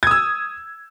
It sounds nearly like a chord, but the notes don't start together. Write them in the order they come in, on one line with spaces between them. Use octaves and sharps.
G#6 D#6 E6